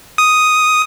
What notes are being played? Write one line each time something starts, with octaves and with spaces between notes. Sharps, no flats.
D#6